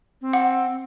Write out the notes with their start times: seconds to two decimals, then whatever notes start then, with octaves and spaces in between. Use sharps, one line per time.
0.22 C4
0.33 F#5